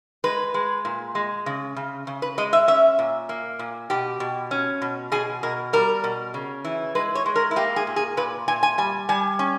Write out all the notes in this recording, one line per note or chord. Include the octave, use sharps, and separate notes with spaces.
G#3 B4
G#3
A#2
G#3
C#3
C#3
C#3
B4
G#3 D#5
E5
C#4 E5
A#2
A#3
A#2
B2 G4
B2
C#4
B2
B2 G#4
B2 A#4
G3 A#4
B2
C#3
E3
G#3 B4
C#5
G#3
A#4
E4
A#3 G4
G#4
A#2
G#4
A#2 B4
A#2 G#5
G#5
G3 G#5
G3 G#5
C#4